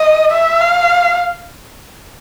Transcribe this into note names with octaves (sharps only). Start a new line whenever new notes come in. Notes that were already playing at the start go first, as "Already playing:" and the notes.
Already playing: D#5
E5
F5